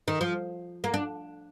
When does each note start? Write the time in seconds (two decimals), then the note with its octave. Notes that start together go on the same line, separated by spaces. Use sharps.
0.08 D#3
0.21 F3
0.84 A#3
0.94 D4